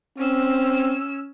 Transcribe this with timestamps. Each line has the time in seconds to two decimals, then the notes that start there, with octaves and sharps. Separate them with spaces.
0.18 C4 C#4 E6